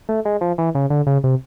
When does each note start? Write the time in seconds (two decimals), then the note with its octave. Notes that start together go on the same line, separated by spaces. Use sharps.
0.09 A3
0.25 G#3
0.41 F3
0.58 E3
0.75 C#3
0.90 D3
1.07 C#3
1.24 C3